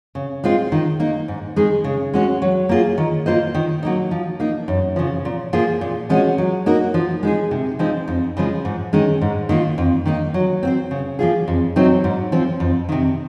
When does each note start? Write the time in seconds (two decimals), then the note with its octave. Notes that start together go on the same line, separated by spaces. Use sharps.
0.15 C#3
0.44 G#3 C4 F4
0.72 D#3
1.00 A#3 D#4
1.28 G#2
1.56 D#3 G#3 D#4 G#4
1.84 C#3
2.14 G#3 C#4 F#4 C#5
2.42 F#3
2.69 A#3 F4 G#4
2.98 D#3
3.26 A#3 F4 C5 D#5
3.54 D#3
3.83 F#3 A#3 D#4
4.11 F3
4.40 A#3 D#4
4.68 F#2
4.96 C#3 F3
5.25 A#2
5.53 F3 A#3 F4 G#4
5.81 A#2
6.10 F3 G#3 C#4 F#4
6.38 F#3
6.66 A#3 D#4 F#4 A#4
6.94 F3
7.23 G#3 D#4 G#4
7.51 C3
7.79 F3 G#3 C4 D#4
8.08 F2
8.37 C#3 F3 G#3
8.65 G#2
8.93 D#3 G#3 C#4
9.21 G#2
9.49 D#3 A#3 F4
9.78 F2
10.06 D#3 A#3 D#4
10.34 F#3
10.63 C4 F#4 C5
10.91 C#3
11.19 F3 A#3 F4 G#4
11.48 F2
11.76 C3 F#3 C4 D#4
12.04 G#2
12.32 F3 C4
12.60 F2
12.89 C3 D#3